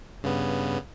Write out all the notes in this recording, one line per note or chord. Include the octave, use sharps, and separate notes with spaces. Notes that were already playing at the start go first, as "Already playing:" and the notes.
G2 C#3 B3